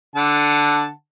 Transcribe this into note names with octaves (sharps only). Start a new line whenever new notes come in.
D3 F#5 A5